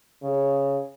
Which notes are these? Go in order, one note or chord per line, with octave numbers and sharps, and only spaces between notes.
C#3